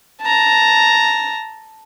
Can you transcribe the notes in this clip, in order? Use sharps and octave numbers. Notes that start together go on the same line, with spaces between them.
A5 A#5